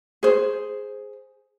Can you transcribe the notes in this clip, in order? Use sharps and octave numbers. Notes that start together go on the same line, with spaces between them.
G#4 C5